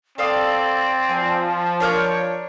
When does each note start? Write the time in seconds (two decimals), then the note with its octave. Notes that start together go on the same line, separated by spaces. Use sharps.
0.18 C4 A4 D5 F5 D#6
1.09 F3 G#5
1.80 D4 A#4 C#5 G6